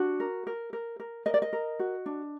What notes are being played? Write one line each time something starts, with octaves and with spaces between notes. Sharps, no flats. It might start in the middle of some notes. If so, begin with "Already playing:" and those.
Already playing: D4 F#4
A#4
A#4
A#4
A#4
A#4 D#5
D5
D#5
A#4
F#4
D4